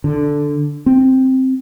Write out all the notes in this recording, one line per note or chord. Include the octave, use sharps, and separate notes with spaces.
D3
C4